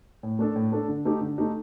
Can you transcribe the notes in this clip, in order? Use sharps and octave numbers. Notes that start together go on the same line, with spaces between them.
A2
A3 D4 A4
A2
A3 D4 A4
D3
A3 D#4 G4
D3
A3 D#4 G4